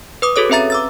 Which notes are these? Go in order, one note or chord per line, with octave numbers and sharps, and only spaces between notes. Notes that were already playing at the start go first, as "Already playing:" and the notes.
B4 D6 D#6
F#4 G#4 A4 C#5 D#6
C4 C#4 B4 E5 A#5 A6
D6 E6 A6